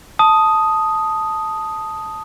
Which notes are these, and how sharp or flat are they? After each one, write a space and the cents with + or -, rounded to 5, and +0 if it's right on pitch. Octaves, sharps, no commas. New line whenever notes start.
A5 +0 D#6 +0